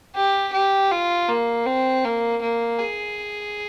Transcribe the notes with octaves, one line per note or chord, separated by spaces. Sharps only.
G4
G4
F4
A#3
C4
A#3
A#3
G#4